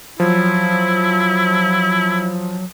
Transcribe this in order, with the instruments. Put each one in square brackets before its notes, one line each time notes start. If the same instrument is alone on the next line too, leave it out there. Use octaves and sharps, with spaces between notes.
[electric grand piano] F3 [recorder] F#3 [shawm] E4